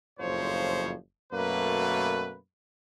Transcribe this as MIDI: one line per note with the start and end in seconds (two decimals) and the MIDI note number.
0.19 0.93 30
0.19 0.93 41
0.19 0.93 45
0.19 0.93 53
0.19 0.93 72
0.19 0.93 73
1.32 2.36 42
1.32 2.36 47
1.32 2.36 57
1.32 2.36 58
1.32 2.36 71